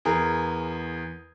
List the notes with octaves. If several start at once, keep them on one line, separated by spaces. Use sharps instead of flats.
E2 G#4 A#4